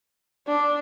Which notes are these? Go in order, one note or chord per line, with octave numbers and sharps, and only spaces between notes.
D4